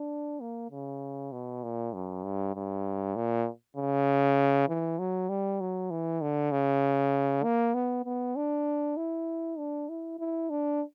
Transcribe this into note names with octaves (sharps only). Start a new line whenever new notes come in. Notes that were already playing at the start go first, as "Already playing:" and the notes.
Already playing: D4
A#3
C#3
B2
A#2
F#2
G2
G2
A#2
C#3
E3
F#3
G3
F#3
E3
D3
C#3
A#3
B3
B3
D4
E4
D4
E4
E4
D4